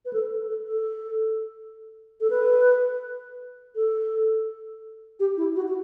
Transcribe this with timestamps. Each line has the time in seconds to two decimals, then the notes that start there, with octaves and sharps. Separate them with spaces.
0.05 B4
0.13 A4
0.49 A4
0.67 A4
2.21 A4
2.30 B4
3.75 A4
5.20 G4
5.37 E4
5.55 F#4
5.68 F#4